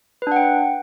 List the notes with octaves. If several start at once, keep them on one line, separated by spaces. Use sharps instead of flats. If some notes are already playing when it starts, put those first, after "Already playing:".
D4 B4 F#5 G5